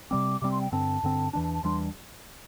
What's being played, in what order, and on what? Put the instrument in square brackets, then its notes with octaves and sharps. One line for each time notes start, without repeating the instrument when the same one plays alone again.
[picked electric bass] C3 G3 C4 [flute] D6
[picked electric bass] C3 G3 C4 [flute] D6
[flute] C6
G5
[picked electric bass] G2 D3 C4 [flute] A5
[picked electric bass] G2 D3 C4
[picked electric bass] E2 E3 G3 D4 [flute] A5
[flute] A5
A5
[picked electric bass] E2 E3 G3 D4 [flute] C6